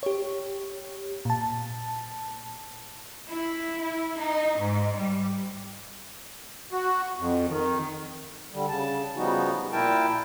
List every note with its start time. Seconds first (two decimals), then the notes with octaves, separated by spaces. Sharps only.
0.03 G4 C#5
1.25 A#2 A5
3.28 E4
3.81 E4
4.19 D#4
4.59 G#2
4.95 G3
6.73 F#4
7.19 F2
7.49 D#3
8.52 D3 G3
8.69 C#3 A5
9.16 C#3 F3 G3 B3 D#4 F#4
9.72 A#2 E4 A#4 G5 A5